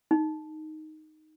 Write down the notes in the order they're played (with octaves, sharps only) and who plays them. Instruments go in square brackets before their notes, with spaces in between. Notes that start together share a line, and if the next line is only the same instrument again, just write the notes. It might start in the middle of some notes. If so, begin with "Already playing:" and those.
[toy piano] D#4